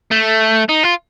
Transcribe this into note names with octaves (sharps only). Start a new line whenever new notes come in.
A3
D#4
F4